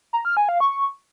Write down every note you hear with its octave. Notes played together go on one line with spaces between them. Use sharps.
A#5
F6
G#5
F5
C#6